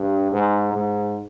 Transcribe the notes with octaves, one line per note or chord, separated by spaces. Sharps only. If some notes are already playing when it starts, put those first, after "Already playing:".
Already playing: G2
G#2
G#2